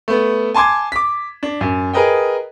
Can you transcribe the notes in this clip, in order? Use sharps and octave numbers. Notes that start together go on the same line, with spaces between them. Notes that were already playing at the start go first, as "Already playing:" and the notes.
A3 B3
G#5 A5 C6 D6 G#6
D6 B6
D4
F#2
G#4 A#4 B4 D#5 G5